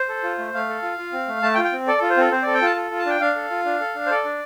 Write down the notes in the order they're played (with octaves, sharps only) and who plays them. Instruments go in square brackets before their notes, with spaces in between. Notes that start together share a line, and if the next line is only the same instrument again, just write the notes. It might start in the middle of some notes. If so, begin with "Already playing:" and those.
Already playing: [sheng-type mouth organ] C5
A4
F4
A3
A3 F5
A4
F4
F4
C4
A3
A3 A5
G5
F4
G5
C4
A4 D5
F4 A4
C5
C4 A4
C4 C5
A4 D5
G5
F4 A5
A4
F4
A5
D4 G5
D4 F5
A4
F4
D4
A4
D4
C5
A4 D5
D4